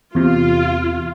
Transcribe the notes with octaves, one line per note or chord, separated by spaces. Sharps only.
E2 C3 F4